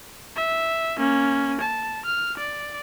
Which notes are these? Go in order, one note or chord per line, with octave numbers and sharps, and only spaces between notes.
E5
A#3 C#4
A5
F6
D5